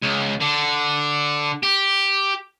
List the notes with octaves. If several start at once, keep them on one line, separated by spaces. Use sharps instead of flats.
C#2
D3
G4